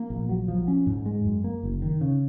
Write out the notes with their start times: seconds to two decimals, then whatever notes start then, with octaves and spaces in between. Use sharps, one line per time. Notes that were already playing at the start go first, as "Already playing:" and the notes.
Already playing: A#3
0.10 A#1
0.29 F#3
0.48 F3
0.68 C#4
0.87 G#2
1.06 G#3
1.25 F#2
1.44 A#3
1.63 F#1
1.82 D#3
2.01 C#3